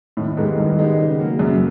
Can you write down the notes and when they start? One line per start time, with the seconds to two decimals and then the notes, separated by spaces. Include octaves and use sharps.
0.17 A2 D#3
0.28 A2
0.37 G#2 G#3 B3 D#4 G4
0.57 G2 D#3
0.79 G#3 B3 D#4 G4
0.99 C#3
1.19 F#3 A#3
1.39 F#2 C#3